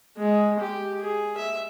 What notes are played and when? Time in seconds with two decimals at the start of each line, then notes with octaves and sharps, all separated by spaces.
0.17 G#3
0.60 G4
1.01 G#4
1.37 E5